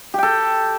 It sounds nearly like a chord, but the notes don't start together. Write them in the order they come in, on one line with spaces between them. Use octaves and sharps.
G4 G5 A4